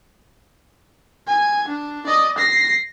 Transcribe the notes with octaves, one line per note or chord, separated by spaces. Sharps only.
G#5
D4
D5 D#5
A#6 C7